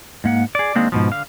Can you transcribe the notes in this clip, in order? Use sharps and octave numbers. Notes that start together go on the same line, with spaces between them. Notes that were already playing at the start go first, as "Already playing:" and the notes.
G#2 A#3 F#5
G#4 D5
D#3 G#3 A#3 C4 D4
G#2 B2 F3
D3 F5